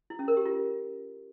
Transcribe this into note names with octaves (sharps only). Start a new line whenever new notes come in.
E4
C#4
A#4
G4
F4